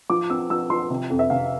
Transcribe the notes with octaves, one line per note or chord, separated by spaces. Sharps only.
F3 D6
C4 E6
F3 E6
F3 C6
C3
F2
E5
C3 F5